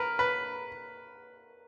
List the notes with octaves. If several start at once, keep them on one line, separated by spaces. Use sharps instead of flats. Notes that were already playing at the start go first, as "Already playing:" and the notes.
Already playing: A#4 B4
B4